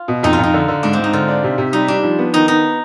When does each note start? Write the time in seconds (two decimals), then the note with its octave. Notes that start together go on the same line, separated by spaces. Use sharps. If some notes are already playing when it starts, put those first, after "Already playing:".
Already playing: F4
0.08 B2
0.23 F2 D#4
0.33 F4
0.39 F2 D#4
0.54 D3
0.68 D3
0.83 G#2 D4
0.93 C4
0.98 G#2
1.04 D#4
1.13 D3 F4
1.28 D4
1.44 C3
1.58 C3
1.73 G3 D#4
1.88 G3 D4
2.03 F3
2.18 B3
2.33 D#3 D#4
2.48 B3 D#4